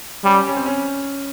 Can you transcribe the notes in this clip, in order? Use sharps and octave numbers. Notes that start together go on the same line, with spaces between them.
G3 C#4
C#4
C4
C#4